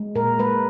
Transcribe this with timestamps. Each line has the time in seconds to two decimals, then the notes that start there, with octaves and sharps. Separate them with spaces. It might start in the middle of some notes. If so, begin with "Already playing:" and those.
Already playing: G#3
0.15 A#2 A#4
0.39 G#3 B4